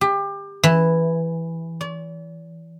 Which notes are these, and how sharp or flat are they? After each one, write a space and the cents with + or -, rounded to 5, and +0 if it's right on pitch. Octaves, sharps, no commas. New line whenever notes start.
G4 +25
E3 +0
D5 -40